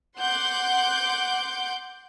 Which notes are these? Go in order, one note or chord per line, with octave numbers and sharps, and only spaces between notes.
F#5 C6 D6 G6